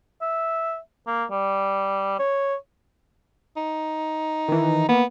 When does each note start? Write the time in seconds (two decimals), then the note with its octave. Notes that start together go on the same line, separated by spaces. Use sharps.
0.22 E5
1.07 A#3
1.31 G3
2.19 C#5
3.57 D#4
4.48 D#3 E3
4.89 A#3 B3